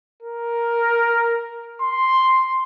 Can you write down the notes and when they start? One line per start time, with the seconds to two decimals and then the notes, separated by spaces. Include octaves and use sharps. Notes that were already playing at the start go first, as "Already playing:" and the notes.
0.22 A#4
1.81 C6